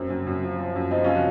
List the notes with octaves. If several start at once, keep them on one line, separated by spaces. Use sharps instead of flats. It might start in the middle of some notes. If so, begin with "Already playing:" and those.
Already playing: F#2 C4
F#2
F#2
F3
F3
F#2
F3 C4 D#4
F3 C#4 F4
F#4